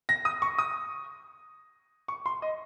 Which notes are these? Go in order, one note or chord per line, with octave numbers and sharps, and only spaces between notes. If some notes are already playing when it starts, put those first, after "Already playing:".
A#6
D#6
C#6
D#6
C#6
C6
D#5